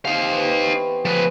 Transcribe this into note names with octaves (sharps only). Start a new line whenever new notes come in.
C3 D#4 F4 G4 F5
E3 C5 G5
B3 C#6
A2 F3 G#3 B3 B4